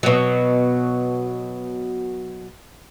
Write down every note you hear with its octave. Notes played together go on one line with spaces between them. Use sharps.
B2 F#3